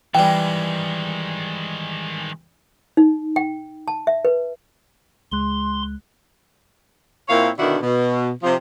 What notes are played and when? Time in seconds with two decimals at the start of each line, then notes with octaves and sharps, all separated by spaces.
0.15 D#3 E3 G3 G#3 G5
2.97 D#4
3.36 G5
3.88 A5
4.07 E5
4.25 B4
5.32 C#2 G#3 C6 F#6
7.29 A#2 C4 E4 A#4 C#5 F5
7.58 B2 D3 D#3 D4 E4 F#4
7.82 B2
8.43 C3 F3